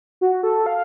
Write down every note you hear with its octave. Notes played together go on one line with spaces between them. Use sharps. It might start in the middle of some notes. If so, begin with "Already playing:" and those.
F#4
A4
F5